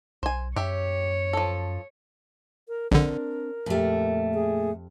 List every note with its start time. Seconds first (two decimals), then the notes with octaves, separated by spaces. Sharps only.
0.23 B1 C5 G#5
0.56 F#2 G4 C#5 E5
1.33 F3 A4
2.68 A#4
2.92 A#1 D3 C4 D4 A#4
3.66 F2 A#2 A3 G4
4.34 G#4